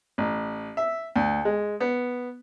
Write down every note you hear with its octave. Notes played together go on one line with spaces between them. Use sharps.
A1
E5
D2
G#3
B3